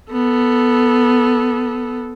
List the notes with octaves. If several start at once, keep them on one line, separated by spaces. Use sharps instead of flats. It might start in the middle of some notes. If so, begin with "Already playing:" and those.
B3 A4